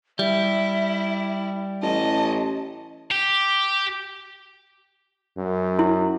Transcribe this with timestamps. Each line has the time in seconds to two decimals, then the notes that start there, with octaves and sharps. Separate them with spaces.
0.19 G3 E4 E5
1.82 A1 D#5 A5
3.11 G4
5.37 F#2
5.79 E4